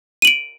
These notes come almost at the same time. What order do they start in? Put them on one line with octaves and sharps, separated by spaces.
D#7 F#7 D7